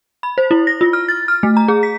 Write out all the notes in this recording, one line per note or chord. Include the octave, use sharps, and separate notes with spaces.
B5
C5
E4
A#6
F4
F6
A6
F6
A3
A#5
G#4
B6